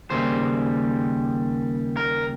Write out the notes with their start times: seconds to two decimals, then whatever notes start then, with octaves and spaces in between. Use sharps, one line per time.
0.10 D#2 C#3 G3 C5
1.97 A#4